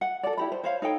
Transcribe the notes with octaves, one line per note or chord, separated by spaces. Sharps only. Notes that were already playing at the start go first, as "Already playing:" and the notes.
F#5
A4 D5
E4 G4 B5
C5
C5 C#5 F5
D#4 A4 C#5 G5